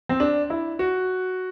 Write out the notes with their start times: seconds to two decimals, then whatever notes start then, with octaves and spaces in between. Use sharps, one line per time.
0.09 C4
0.20 D4
0.50 E4
0.79 F#4